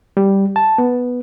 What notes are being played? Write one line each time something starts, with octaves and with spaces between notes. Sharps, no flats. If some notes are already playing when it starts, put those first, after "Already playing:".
G3
A5
B3